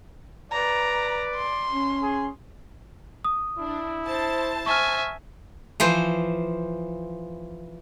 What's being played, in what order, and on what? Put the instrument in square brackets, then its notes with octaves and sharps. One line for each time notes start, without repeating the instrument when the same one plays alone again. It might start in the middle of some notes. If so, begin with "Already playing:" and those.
[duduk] B4 [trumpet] D5 [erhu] A#5
[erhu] C6
[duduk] C#4
[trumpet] G#4
[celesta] D#6
[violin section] D4 [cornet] E4
[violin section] C5 A5
[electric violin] E5 G#5 [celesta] C#6 F6
[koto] E3 F3 C5